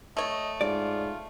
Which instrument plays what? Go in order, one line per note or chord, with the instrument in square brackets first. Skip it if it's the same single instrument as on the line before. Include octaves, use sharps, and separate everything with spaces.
[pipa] A3 C#5 [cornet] D#5
[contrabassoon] G#2 [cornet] F4 [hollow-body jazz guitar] D5